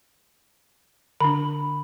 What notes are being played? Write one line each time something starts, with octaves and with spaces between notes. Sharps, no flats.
D3 D4 B5